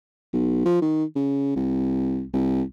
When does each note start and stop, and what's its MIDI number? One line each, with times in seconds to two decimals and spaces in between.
0.33 0.63 35
0.66 0.82 53
0.82 1.04 51
1.16 1.54 49
1.56 2.25 36
2.33 2.62 36